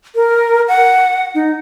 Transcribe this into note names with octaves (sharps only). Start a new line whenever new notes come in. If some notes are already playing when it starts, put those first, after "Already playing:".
A#4
F#5
D#4